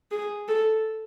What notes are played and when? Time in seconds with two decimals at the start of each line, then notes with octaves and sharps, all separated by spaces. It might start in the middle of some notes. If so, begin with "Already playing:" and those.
0.11 G#4
0.48 A4